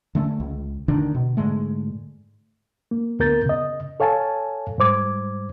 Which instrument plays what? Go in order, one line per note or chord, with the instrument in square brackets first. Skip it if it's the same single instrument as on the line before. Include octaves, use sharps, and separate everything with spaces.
[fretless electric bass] D3 A3 C#4
C#2
D2 D3 D#3 D4
B2
G#2 D3 G#3 A3
[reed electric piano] A#3
D2 B3 A#4 G6 A6
C#3 D#5
A4 C#5 F5 G#5 A5
G#2 G3 C5 D6 G#6